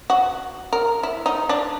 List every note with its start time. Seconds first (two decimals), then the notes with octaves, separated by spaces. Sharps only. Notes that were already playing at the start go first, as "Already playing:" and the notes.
0.10 F#4
0.73 A#4
1.03 E4
1.26 D#4
1.49 D4